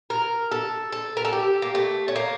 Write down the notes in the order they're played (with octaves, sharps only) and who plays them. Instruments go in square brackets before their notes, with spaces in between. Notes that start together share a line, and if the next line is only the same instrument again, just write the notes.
[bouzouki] A#4
A4
A4
A#4
A4
G4
A#3
A3
C#4
A#3